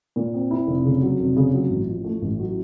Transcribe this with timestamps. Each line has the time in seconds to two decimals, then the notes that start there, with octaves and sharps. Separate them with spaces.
0.16 A#2
0.34 C4
0.51 E4
0.67 F1
0.85 C#3
1.02 F#3
1.20 F1
1.36 C#3
1.54 F#3
1.70 A1
1.88 F3
2.04 A3
2.22 A1
2.40 F#3